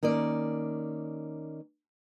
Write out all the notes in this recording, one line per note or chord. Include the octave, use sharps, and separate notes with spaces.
D#3 A#3 C#4 D5